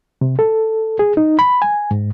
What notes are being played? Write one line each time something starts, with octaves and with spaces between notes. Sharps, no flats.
C3
A4
G#4
D#4
B5
G#5
G#2